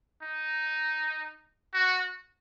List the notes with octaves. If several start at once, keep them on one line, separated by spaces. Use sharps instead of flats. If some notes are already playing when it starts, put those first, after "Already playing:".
D#4
F#4